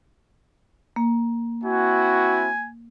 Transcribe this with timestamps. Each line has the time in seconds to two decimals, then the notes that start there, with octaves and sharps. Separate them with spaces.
0.96 A#3
1.64 C4 E4 F#4 G#5